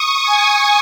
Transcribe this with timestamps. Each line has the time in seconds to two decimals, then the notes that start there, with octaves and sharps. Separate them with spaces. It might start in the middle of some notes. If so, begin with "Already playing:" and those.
Already playing: C#6 D#6
0.24 G#5